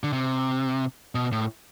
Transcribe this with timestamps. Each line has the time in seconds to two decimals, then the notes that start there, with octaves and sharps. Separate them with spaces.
0.04 D3
0.13 C3
1.15 B2
1.32 A2